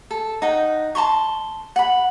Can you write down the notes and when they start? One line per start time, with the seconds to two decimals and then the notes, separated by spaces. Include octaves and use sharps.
0.11 A4
0.42 D#4 F#5 G5
0.95 A5 A#5 C6 C#6
1.76 F#5 B5